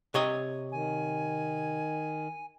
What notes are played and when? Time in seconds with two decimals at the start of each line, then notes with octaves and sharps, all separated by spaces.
0.14 C3 C#5 D#5
0.72 D#3 G#5